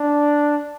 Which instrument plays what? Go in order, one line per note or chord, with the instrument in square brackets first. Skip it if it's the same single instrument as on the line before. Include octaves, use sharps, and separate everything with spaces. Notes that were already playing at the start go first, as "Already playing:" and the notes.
Already playing: [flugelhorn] D4